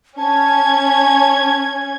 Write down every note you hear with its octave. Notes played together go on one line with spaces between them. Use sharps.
C#4 A5 G#6